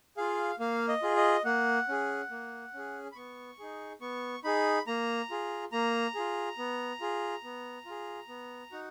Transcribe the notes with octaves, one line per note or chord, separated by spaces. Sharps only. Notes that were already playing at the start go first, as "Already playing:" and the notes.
F4 G#4 F5
A#3 F5
D#5
F4 G#4
D#5
A#3 F#5
C#4 G#4
A#3
C#4 G#4
B5
B3 C#6
D#4 G#4
B3 C#6
D#4 G#4 B5
A#3 A#5
F4 G#4
A#3 A#5
F4 G#4
B3
F4 G#4
B3
F4 G#4
B3
D#4 F#4